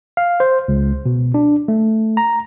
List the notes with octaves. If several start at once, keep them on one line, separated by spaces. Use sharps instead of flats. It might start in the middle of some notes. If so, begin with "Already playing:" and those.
F5
C5
C#2
B2
D4
A3
A#5